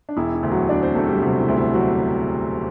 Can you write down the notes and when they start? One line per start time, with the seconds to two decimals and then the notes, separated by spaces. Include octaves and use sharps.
0.09 D4
0.17 E1 E4
0.34 E4
0.43 D2
0.51 F#3 F#4
0.69 E1 D4 D5
0.82 C4 C5
0.95 E1 A3 A4
1.09 G3 G4
1.22 C3 F#3 F#4
1.40 E4
1.48 D2
1.57 E4
1.74 F#3 F#4